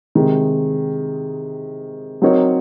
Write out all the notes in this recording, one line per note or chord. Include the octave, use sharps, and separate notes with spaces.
C3 D#3 G#3
F#3 C4 D#4 A#4 C#5